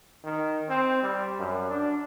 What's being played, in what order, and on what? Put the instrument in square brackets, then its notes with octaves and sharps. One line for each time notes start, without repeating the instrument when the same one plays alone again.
[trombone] D#3
C4
G3
F#2
D4